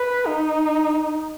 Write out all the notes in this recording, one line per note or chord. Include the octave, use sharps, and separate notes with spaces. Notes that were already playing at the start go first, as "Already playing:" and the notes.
Already playing: B4
D#4